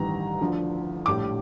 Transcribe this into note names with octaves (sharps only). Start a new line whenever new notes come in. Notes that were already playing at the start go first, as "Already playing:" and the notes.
Already playing: A1 G2 D#3 G3 A#5
D2 D3 F3
A#1 A2 G3 D6